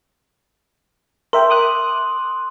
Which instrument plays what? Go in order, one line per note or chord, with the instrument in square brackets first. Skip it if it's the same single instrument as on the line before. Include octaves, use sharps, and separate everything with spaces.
[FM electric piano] A#4 E5 G5 [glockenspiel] C6
[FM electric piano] D6 D#6 F#6